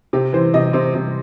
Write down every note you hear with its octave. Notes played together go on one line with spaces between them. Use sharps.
C3 G4
E3 C5
C3 D#5
C3 C5
C3